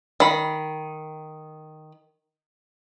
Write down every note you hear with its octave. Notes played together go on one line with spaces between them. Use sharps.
D#3 B5